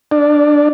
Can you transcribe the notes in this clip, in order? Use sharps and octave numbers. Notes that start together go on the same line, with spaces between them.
D4